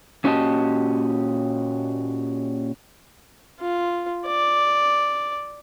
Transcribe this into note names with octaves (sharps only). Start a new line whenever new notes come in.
A#2 C#4 F#4 G4 D#5 A5
F4
D5